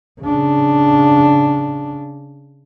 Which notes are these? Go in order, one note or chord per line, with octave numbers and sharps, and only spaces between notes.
C#3 D4